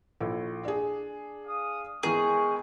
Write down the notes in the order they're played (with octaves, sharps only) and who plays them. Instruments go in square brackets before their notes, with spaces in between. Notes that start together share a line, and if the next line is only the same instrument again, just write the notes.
[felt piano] A#1 E4 A4
D4 G#4
[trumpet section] F5 D#6
[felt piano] E3 B3 A#4 [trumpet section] G#3 G5 C#6 [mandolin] G#4